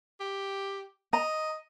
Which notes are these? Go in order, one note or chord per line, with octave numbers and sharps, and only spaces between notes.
G4
D#5 A#5